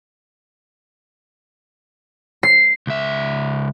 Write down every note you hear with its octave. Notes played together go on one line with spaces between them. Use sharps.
C7
C#2 E5